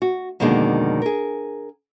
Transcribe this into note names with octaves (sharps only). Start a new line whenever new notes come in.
F#4
F2 B2 D3 D#3 G#3 A#3
G#4 A#4